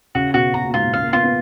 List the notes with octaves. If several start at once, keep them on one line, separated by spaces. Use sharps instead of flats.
C#3 F#4
B2 F#4
B2 A#5
A#2
G#2 F4
A#2
C#3 F5
A#3
B3 F4
B3